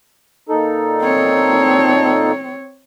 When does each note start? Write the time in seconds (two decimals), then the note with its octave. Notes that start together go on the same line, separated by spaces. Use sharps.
0.49 A#2 D#4 A4
1.02 C4 C#5